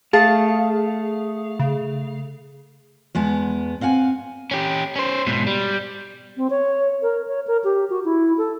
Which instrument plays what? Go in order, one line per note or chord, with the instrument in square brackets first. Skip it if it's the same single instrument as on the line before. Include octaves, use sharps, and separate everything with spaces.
[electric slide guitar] A3 F5 [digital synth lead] G#4 [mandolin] A5
[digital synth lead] C#3
[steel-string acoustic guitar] E2 G#3 B3 A5
C4 F5 F#5 G#5
[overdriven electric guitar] C#4 G4
C#4 C5
G#2 B2
G3
[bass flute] C4
C#5
A#4
C#5
A#4
G4
F#4
E4
A4